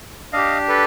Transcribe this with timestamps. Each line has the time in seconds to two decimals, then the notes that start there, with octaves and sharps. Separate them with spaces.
0.33 D4 G4 D#5 F5
0.68 A4 B4